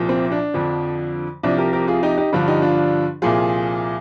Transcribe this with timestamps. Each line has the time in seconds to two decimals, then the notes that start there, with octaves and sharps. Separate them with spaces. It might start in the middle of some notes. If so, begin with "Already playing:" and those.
Already playing: C2 A#2 F3
0.09 C4
0.31 D4
0.54 F2 D3 F3
1.43 C2 C3 F3 D4
1.58 G4 A#4
1.73 G4 A#4
1.88 F4 G#4
2.03 D#4 G4
2.17 D#4 G4
2.32 G2 D3 F3 D4 F4
2.48 D#4 G4
2.62 D4 F4
3.22 C2 A#2 F3 F4 G#4